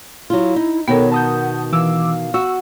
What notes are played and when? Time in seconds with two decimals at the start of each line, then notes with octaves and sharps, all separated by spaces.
0.30 F#3 E4 F4
0.56 D#4
0.88 B2 D#3 B3 A4 A#4 C#5 G5
1.12 F#5 A5 D#6 G6
1.72 E3 F5 D6 E6
2.34 F#4 C#6 E6